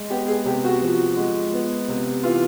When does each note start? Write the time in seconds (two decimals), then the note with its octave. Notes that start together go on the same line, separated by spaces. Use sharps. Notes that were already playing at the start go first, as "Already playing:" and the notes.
Already playing: G#3
0.10 B3 G4
0.28 G#4
0.45 C3 G4
0.64 F#4
0.82 F3
1.16 G#3
1.53 B3
1.88 C3
2.23 E3 F4